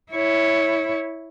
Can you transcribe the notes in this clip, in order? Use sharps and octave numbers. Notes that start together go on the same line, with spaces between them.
E4 C#5